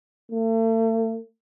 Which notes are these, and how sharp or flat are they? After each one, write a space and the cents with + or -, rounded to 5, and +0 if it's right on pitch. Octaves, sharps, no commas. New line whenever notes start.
A3 +40